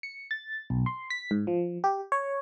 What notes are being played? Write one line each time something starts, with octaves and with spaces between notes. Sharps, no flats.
C#7
A6
B1
C6
B6
G#2
F3
G4
C#5